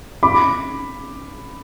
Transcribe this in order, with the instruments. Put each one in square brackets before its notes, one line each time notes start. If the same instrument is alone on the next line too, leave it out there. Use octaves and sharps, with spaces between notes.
[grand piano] B5 D6